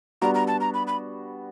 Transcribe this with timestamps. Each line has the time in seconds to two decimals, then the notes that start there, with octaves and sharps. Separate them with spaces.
0.22 G3 B3 D4 F#4 A#5
0.35 A#5
0.48 A5
0.61 A#5
0.74 B5
0.87 B5